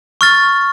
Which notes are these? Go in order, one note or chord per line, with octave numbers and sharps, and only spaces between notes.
C#6 F6 A6